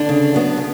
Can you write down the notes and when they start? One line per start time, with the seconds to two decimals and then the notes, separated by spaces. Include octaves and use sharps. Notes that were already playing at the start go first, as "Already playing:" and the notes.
Already playing: D3 D4
0.09 C#3
0.34 F#3 B3
0.57 C#3